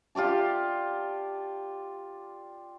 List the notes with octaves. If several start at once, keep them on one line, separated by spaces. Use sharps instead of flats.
F4 G4 D5 A5